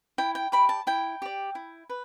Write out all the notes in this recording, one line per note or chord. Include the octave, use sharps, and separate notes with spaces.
E4 G5
G5
G4 D5 B5
A5
E4 G5
G4 D5
E4
B4